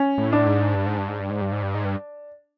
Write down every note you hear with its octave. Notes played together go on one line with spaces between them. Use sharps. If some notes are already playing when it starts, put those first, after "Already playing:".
Already playing: C#4
A2
D4
G#2
G2
G#2
G2
G#2
G2
G#2
G2
G#2
G2
G#2
G2